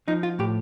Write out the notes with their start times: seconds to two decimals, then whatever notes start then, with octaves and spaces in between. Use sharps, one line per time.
0.08 F3 D#4
0.23 F4
0.39 A2 G4